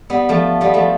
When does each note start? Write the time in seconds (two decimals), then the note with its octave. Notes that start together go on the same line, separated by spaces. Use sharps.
0.10 G3 B3
0.29 F3 A3
0.61 G3 B3
0.74 F3 A3